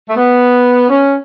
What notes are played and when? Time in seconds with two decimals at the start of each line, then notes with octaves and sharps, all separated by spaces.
0.08 A3
0.17 B3
0.89 C#4